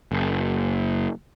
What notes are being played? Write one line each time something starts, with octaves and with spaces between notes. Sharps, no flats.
F#1